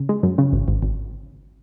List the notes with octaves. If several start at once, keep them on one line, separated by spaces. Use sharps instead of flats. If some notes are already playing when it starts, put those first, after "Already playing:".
Already playing: C#3
G#3
F#2
C#3
G#1
G#1
G#1